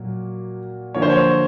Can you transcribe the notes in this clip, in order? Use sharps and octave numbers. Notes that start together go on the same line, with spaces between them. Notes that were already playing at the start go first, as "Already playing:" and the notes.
Already playing: A#2 F#3 A#3
D3 F3 A#3 C#5
C5
C#5